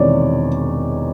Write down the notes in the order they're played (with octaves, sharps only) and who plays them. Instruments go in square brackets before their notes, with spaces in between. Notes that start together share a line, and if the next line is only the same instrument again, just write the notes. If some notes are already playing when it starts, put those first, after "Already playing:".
Already playing: [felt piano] E1 E2 C3 D#3 C#5 D5